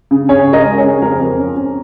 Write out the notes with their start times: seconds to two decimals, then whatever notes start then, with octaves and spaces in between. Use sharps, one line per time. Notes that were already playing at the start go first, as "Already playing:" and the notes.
0.11 C#3
0.29 C#3 G#4 C#5
0.47 C#4
0.53 A#4 D#5
0.65 G#3
0.78 G#4 C#5
0.83 C#3
1.02 F2 A#4
1.20 F2
1.38 C#4
1.56 C#4